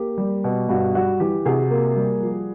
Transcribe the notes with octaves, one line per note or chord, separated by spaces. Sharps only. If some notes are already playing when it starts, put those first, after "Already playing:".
Already playing: A#3 G4
G3
B2
G2 F#4
G3 F#4
E3 G4
C3 F#4 G#4
A#3
G3
F3